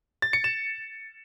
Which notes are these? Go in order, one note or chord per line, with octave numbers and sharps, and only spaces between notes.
A6
C#7
E7